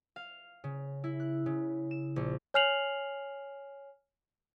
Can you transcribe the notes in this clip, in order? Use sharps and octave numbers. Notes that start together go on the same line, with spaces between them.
F5
C#3
E4
F#6
C#3
E7
A#1
C#5 G#5 F6 C7 F7 F#7